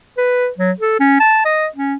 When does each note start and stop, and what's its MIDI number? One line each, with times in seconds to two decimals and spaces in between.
0.17 0.48 71
0.58 0.72 54
0.80 0.97 69
1.00 1.20 61
1.20 1.41 81
1.45 1.67 75
1.76 1.95 61